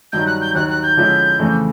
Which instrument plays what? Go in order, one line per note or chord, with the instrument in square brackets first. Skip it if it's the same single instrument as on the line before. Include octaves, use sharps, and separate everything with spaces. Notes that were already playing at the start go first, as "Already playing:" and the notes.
[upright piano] G2 D#3 F#3 [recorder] G6
[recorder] F#6
G6
[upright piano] D#2 D#3 F#3 [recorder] F#6
[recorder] F#6
G6
[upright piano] D3 F3 G#3 C#4 E4
F2 C#3 E3 A3